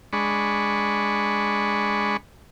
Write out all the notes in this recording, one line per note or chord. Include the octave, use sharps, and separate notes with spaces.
G#3 D4 B5 C#6